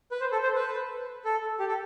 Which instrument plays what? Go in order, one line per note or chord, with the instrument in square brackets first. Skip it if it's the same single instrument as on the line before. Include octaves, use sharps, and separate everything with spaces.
[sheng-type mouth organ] B4
C5
A4
C5
B4
A4
G4
A4